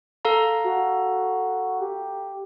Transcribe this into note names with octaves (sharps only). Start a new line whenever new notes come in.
A4 F5 A#5
F#4
G4